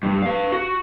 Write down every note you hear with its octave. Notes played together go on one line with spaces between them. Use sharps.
G2
B4 F5
F#4